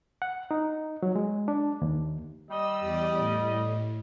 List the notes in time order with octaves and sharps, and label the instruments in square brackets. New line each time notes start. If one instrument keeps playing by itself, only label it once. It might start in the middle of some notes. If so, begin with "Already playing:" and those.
[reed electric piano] F#5
D#4
F#3
G#3
D4
D#2
[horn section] G3 D#5 [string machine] E6
[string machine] E2 G4 D5
A2